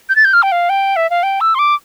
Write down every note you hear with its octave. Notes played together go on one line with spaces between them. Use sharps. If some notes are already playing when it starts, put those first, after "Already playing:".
G6
A6
G6
F6
G5
F5
G5
E5
F5
G5
E6
C6
D6